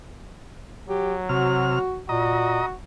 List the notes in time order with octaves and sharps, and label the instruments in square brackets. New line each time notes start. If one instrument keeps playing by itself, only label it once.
[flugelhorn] F#3 [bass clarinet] G4
[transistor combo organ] C3 F6 [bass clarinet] F#4
[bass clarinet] A#2 [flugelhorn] F#4 [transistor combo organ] D#5 A#5